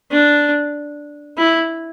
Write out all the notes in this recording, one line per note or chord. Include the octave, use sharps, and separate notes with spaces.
D4
E4